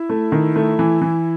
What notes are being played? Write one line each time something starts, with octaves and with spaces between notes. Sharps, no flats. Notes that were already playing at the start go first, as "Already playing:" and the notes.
Already playing: E4
A3
D#3
A3
E3
E3